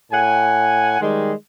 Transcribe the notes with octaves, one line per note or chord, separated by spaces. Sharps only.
A2 F#5 G#5
D#3 G3 G#3